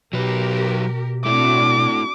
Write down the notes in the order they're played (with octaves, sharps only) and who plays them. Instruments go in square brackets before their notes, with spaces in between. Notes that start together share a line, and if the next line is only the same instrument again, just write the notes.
[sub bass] B2 [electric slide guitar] F#3 B4 [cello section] G4 A#4
[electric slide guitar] A3 E4 [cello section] C4 D4 F#4 [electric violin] D6